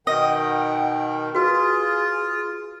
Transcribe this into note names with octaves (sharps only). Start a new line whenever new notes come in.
B2 D#3 D#5 F#5 G5
F4 F#4 G#4 B4